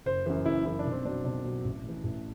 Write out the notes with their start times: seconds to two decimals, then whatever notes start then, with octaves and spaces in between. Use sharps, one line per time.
0.06 F#1 C5
0.26 F#2 E3 C5
0.46 F#1 E4
0.65 F#2 E3 E4
0.79 D4
0.85 B1
0.92 C4
1.05 B2 F#3 D4
1.24 B1 D4
1.45 B2 F#3
1.64 A1
1.84 A2 E3
2.04 A1